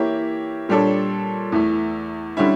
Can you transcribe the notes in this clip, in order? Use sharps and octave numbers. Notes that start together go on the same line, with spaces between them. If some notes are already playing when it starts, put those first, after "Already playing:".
Already playing: E3 A#3 E4 G4 C#5
A#2 G3 D4 A4 C#5
E2 E3 A3
D3 G3 C#4 E4